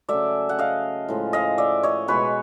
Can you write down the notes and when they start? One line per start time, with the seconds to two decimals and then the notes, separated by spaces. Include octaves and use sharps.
0.09 C#3 F#3 A3 D5 E5
0.49 F#5
0.59 D#5 F5
1.09 A2 F3 G#3
1.33 D#5 F5
1.58 D5 E5
1.83 C#5 D#5
2.08 B2 G#3 B4 C#5